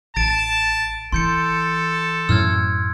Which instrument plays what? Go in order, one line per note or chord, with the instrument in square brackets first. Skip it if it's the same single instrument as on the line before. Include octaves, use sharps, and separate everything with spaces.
[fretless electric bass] A1 [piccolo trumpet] A5 [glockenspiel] A6 D7
[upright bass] E3 [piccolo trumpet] A4 [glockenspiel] C6 G6 C#7
[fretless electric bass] F#2 A2 F#3 [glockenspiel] E6 F6 G#6